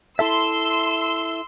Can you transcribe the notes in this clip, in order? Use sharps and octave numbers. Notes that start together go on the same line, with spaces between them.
E4 A4 E5 C6 E6